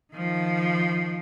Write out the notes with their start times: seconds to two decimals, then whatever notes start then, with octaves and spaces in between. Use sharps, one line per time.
0.14 D#3 F3